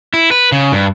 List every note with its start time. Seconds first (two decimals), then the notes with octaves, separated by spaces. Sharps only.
0.14 E4
0.31 B4
0.52 C#3
0.72 G2